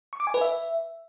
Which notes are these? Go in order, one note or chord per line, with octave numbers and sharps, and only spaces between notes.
C#6
D6
G#5
B4
E5